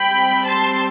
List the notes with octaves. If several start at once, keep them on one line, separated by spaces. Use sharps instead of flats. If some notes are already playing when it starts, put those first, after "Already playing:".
Already playing: G3 C4 G5 B5
A5 C6